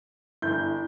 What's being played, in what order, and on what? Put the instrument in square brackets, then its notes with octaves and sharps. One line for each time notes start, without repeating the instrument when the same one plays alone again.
[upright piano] G1 G6 [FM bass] E4